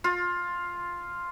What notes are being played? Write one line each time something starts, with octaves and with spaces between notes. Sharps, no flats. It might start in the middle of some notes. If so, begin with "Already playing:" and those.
F4